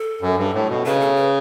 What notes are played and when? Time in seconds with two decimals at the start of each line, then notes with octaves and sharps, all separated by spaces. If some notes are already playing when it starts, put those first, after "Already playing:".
Already playing: A4
0.21 F#2
0.37 G2
0.53 A2
0.68 B2
0.85 C#3 B4
1.01 A4
1.16 B4